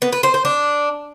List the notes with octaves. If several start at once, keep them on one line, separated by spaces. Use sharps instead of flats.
B3
B4
C5
C5
D4